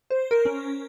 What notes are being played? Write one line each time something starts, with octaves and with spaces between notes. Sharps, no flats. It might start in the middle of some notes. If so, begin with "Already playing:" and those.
C5
A#4
C#4